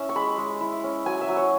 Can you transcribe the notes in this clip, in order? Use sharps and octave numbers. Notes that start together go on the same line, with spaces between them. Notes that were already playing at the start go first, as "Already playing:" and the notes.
Already playing: C#4 E4 E6
C#6
G#3 B5
G#3
E4
C#4
F#3 G#5
E5
F#3
C#5